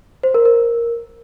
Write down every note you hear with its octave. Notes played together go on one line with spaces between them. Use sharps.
C5
A#4
A#4